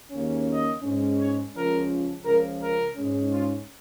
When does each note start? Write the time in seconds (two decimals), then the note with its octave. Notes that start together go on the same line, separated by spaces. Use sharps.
0.11 D#2 C#3 A#3 C#4
0.48 D#5
0.82 G#2 G#3 C#4
1.18 C#5
1.54 C#2 C#3 F3 C#4 A#4
2.24 C#2 C#3 F3 C#4 A#4
2.60 A#4
2.96 G#2 G#3 C#4
3.31 F4